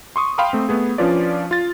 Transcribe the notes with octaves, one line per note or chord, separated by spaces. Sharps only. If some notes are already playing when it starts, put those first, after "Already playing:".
C6 C#6 D#6
F5 G5 B5 C6 D#6
A3 C4
A3 B3 G#4
F3 C#4 D4 F4 B4 D5
F4 A6